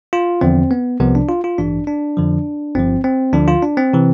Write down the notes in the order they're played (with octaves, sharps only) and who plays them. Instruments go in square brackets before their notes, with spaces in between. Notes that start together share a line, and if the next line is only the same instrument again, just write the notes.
[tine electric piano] F4
E2 D3 F3 C4
B3
C2 C3 F3 B3
D4
F4
F4
A1 G2 E3 D4
D4
F2 D3 F3
G1 G2 F3 C4
C4
D2 D3 F3 D4
F4
D4
C4
C3 E3